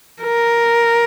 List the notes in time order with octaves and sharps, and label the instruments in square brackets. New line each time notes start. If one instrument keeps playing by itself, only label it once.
[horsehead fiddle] A#4